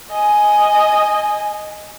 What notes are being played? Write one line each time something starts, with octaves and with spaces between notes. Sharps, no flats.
D#5 G#5